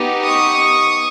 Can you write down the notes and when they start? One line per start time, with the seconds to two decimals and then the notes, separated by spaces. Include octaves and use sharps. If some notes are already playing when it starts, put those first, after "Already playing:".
Already playing: B3 D#4 G4
0.26 C#6 D#6